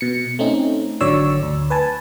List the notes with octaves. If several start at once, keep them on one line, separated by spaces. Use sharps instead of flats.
B2 C#7
A3 C4 C#4 D#4
G#1 D3 F#3 C#5 D5 E6
D2
B4 G#5 A5